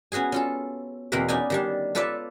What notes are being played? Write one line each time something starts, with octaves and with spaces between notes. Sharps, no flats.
B3 C#4 F#4 G#4 G#5
C#4 F4 A4
E2 B2 A#3 C4 A#4 B4
B3 C#4 D#4 D5 G#5
D#3 G3 D4
F4 A4 B4 C#5 D5 E5